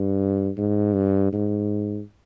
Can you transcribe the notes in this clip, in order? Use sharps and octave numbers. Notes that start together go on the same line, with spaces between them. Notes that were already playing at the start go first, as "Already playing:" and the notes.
Already playing: G2
G#2
G2
G#2